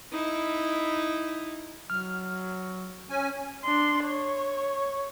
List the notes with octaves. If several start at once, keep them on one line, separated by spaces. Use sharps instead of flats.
D#4 E4
F#3 F6
C#4 G#5
D4 C6
C#5